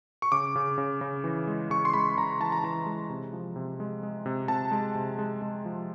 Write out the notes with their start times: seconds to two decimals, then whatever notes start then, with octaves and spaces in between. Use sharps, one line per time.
0.22 C#6
0.32 C#3 D6
0.56 C#3
0.78 C#3
1.01 C#3
1.24 E3
1.48 G#3
1.70 C#3 C#6
1.85 C6
1.93 G#3 B5
2.17 C#3 A#5
2.40 E3 A5
2.52 A#5
2.63 E3 A5
2.86 G#3
3.10 C3
3.33 F3
3.56 C3
3.80 G#3
4.03 G#3
4.26 C3
4.48 C3 A5
4.72 G#3
4.95 C3
5.19 G#3
5.42 G#3
5.65 F3